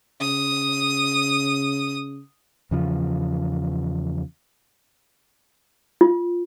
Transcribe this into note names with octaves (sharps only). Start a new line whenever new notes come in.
C#3 D#6
E2 C#3 F3
F4